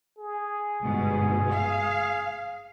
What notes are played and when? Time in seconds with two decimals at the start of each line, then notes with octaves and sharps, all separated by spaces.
0.18 G#4
0.81 G1 G#2 B2
1.52 F5